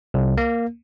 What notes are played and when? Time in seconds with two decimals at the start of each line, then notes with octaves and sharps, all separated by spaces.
0.14 C2
0.38 A#3